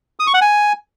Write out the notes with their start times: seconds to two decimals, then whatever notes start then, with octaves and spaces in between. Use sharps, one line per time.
0.20 D#6
0.27 C#6
0.34 F#5
0.41 G#5